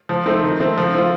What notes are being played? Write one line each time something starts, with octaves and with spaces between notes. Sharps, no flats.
F3
A3 C4 D#4
D#3
A3 C4
F3
C4 F4